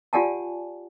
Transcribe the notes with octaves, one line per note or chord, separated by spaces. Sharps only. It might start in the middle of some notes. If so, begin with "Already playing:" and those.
F4 G4 D5 F#5 G#5 A5